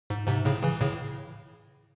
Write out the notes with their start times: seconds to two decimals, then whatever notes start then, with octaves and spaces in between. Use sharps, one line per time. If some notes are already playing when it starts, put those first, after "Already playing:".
0.10 G#2
0.28 G#2 C3
0.45 A2 C#3
0.63 C#3 E3
0.81 A2 C#3